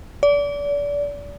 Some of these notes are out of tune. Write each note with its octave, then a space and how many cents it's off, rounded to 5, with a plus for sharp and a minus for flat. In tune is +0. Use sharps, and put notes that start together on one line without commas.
D5 -30